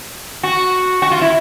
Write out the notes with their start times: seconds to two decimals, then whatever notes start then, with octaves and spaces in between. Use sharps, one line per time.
0.43 F#4
1.02 F#4
1.11 F4
1.21 E4